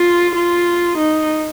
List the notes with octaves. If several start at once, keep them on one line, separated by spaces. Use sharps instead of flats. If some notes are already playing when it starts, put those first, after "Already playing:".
Already playing: F4
F4
D#4